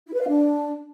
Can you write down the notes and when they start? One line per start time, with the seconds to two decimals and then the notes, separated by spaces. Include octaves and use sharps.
0.06 E4
0.14 B4
0.21 F5
0.28 D4